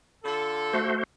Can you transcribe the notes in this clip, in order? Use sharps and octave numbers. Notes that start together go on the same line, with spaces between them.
D3 F4 A4
A3 F#4 C5